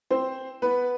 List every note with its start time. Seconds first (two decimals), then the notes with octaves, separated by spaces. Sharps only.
0.11 C4 C5
0.62 B3 B4